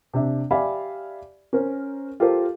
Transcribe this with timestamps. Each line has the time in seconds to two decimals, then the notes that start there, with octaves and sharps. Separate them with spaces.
0.14 C3 D4 E5
0.51 G4 D5 E5 F5 G#5 B5
1.53 C#4 A#4 C5
2.20 F4 G4 A4 A#4 C5